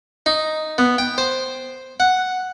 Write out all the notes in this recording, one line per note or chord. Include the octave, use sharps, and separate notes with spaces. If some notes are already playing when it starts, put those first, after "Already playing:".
D#4
B3
G5
C5
F#5